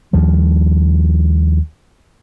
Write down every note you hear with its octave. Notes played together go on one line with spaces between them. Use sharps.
D#2 F3 G3